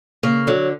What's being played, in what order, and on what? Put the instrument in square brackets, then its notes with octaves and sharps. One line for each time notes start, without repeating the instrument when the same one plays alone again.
[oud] C#3 [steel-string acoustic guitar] A#3
[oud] D3 [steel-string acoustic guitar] F#3